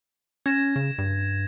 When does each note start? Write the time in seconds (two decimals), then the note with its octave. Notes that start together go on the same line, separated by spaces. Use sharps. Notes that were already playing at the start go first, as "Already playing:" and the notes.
0.46 C#4 G#6 A#6 E7
0.76 C#3
0.98 G2